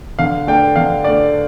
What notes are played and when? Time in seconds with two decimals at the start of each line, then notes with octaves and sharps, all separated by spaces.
0.19 D3 F5
0.47 A3 D4 G5
0.76 D3 F5
1.04 A3 D4 D5